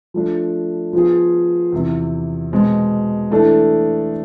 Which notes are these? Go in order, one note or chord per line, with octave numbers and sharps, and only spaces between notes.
F3 A3 D4
F3 B3 F4 G#4
E2 C3 E3
B2 G#3 C4
E3 A3 D4 A4